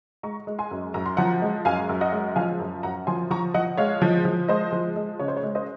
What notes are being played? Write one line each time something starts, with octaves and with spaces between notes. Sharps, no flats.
G#3 A#5 C#6
G#3
G#5 C6
F#2
F#2 A#5
C6
F3 F#5 A#5
G#3
F#2 F5 G#5
F#2
D#5 F#5
G#3
F3 F5 G#5
F#2
F#2 F#5 A#5
F3 G#5 C6
F3 A#5 C#6
F3 D#5 F#5
G#3 C#5 F5
F3
F3
G#3 C5 D#5
F3
G#3
C#3 C#5
C5
C#5
G#3
C5 D#5